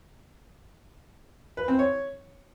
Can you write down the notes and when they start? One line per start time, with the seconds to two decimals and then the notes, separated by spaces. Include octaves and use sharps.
1.57 B4
1.68 C4
1.79 C#5